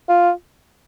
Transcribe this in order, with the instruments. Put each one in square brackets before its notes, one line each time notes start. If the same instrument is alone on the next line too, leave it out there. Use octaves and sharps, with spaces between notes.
[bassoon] F4